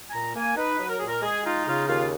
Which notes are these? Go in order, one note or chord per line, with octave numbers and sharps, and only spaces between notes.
G#5
A#2 A#5
A#3 G#5
D#4 B4
F#3
A#4
A#2 G#4
A#4
G#3 G#4
D#4 F4
C#3 F4
D#2 F4